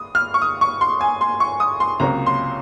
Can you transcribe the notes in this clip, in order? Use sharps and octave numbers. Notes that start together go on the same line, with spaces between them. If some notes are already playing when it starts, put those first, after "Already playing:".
Already playing: D#6
F6
C#6
D#6
C#6
C6
G#5
C6
C#6
D#6
C6
C#2 C3 F#3 A#3 C#4 A#5
C6